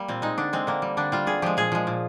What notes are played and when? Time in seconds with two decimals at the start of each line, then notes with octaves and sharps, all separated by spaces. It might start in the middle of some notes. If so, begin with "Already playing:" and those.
Already playing: G3 A#3
0.08 A#2 C4
0.22 G#3 D#4
0.38 D3 D4
0.53 G#3 C4
0.67 D3 A#3
0.82 G3
0.97 D3 D4
1.12 G3 F4
1.27 D3 G#4
1.42 F3 G#3 G4
1.57 A#2 G#4
1.72 F3 G#3
1.87 A#2